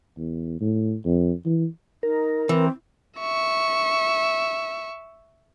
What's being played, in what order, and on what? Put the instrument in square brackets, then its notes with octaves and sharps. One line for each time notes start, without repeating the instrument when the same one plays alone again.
[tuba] E2
A2
F2
E3
[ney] D#4 [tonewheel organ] A#4
[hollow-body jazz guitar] E3 [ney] C4
[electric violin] E5 C#6